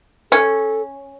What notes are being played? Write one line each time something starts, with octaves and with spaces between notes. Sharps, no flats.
C#4 A4